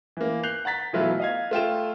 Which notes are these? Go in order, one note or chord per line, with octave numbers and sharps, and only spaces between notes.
E3 A#3
F#6 G6 C7 F7
F#5 A#5 A6 B6
B2 E3 F#3 A3 E4 F4
D#5 F5 G#6
A3 F4 G5 E7